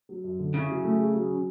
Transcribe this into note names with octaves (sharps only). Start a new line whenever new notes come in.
F#3
F#2
D3
C#3 E4
F#3
A3
G#4
F#3
C#4